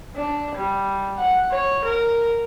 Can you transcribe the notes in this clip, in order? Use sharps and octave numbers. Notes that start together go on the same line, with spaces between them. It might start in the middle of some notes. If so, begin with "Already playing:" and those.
D4
G3
F#5
C#5
A#4